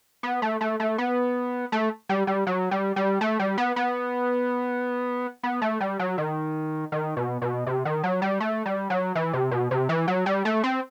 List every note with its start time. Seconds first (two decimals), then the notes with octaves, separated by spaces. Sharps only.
0.23 B3
0.42 A3
0.61 A3
0.80 A3
0.98 B3
1.72 A3
2.09 G3
2.27 G3
2.47 F#3
2.71 G3
2.96 G3
3.21 A3
3.39 G3
3.58 B3
3.76 B3
5.43 B3
5.62 A3
5.80 G3
5.99 F#3
6.18 D#3
6.92 D#3
7.17 B2
7.42 B2
7.67 C3
7.85 D#3
8.04 F#3
8.22 G3
8.40 A3
8.66 G3
8.90 F#3
9.15 E3
9.33 C3
9.51 B2
9.71 C3
9.89 E3
10.08 F#3
10.26 G3
10.45 A3
10.64 C4